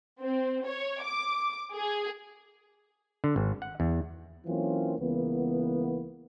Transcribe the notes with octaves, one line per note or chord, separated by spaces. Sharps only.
C4
C#5
D6
G#4
D3
G#1
F#5
E2
E3 F#3 A#3 C4 C#4 F4
C#2 E3 A#3 B3